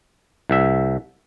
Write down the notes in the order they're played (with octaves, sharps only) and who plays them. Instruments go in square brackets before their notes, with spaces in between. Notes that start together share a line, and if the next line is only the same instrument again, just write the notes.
[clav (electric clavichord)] C2 E5